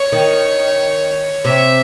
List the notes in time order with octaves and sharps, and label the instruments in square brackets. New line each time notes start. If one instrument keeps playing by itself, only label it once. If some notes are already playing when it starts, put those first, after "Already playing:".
Already playing: [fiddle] C#5
[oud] D#3
[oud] C3 [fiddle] E5